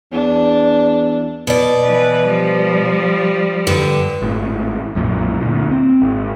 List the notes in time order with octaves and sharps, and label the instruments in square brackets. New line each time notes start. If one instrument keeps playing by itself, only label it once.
[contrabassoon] E2 [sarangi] D4
[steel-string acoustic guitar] B2 D5
[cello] E3 B4
F3 G3
[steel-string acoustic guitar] G2 D3
[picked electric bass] G#1 A2
B1 F#2 A#2
D2 A#2
C4
G#1